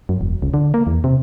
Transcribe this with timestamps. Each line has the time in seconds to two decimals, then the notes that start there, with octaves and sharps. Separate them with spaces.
0.09 F#2
0.21 E1
0.42 C#2
0.54 D3
0.74 A#3
0.87 E2
1.04 C3